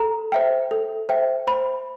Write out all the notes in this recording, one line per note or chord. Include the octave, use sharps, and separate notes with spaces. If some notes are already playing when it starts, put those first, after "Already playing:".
Already playing: A4 A#5
C5 E5 G5
A4
C5 E5 G5
C5 B5